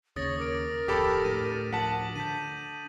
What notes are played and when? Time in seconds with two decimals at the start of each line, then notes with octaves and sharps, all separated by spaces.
0.16 D#2 C#3 C#5 D#6 A6 A#6
0.39 A#4 D6 D7
0.88 D1 F2 G4 A4 B5 D6 A6 B6
1.24 A2 D3 D#7
1.73 D2 A2 F3 F#5 A5 B6 F#7
2.16 D3 G6 B6 D#7